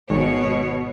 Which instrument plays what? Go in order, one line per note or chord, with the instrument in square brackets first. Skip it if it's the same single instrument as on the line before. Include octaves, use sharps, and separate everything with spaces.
[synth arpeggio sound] G#1 [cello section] B2 C#5